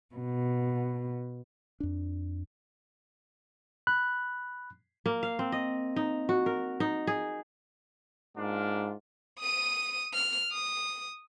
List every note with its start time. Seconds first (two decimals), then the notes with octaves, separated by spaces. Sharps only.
0.15 B2
1.80 F2 D4
3.87 B5 F#6
5.06 A#3
5.23 F5
5.39 C4
5.52 D#5
5.96 D#4
6.29 F#4
6.46 A#4
6.80 D#4
7.07 G#4
8.37 G#2 A#3 D4 F4
9.39 D#6 D#7
10.13 F6
10.52 D#6